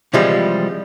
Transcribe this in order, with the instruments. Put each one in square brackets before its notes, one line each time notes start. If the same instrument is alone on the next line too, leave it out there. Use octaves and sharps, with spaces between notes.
[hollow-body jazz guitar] C3 E3 F3 G3 G#3